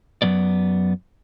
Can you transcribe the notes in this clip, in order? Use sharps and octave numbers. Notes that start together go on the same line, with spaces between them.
F#2 C#3 F#3 B3 D5